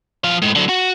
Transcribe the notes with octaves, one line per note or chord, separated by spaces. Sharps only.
F3 F5
A2 G#3
D3 F#3
F#4